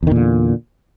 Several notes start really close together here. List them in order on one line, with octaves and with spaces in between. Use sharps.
E2 D#3 A#2 D3